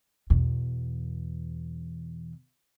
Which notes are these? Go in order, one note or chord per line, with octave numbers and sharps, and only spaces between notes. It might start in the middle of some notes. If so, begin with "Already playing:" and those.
E2 B2